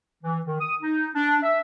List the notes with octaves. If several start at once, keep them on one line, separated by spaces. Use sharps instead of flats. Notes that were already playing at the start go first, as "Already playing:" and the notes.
E3
D#3
D#6
D#4
D4
E5